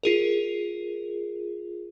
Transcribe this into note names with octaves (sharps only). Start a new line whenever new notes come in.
F4 G#4 A#4